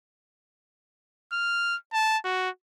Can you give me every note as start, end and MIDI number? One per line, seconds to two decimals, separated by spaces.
1.32 1.76 89
1.93 2.17 81
2.24 2.50 66